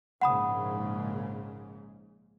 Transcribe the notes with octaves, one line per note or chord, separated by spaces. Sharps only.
A#1 G#2 C#3 F#5 B5 D#6